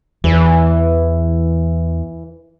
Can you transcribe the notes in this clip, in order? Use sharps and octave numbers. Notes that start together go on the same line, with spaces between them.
E2 E3